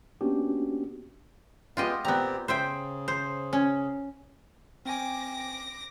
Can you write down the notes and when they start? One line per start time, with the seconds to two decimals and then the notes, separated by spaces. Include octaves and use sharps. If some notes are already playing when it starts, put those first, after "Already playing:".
0.21 A#3 B3 C#4 D4 F#4 G4
1.77 G#3 B3 F4 G4 D#5
2.05 A#2 B3 C4 G4 A#5
2.48 C#3 C5 E5 G5
3.08 C5
3.53 C#4
4.85 C4 G5 G#5 D6 A#6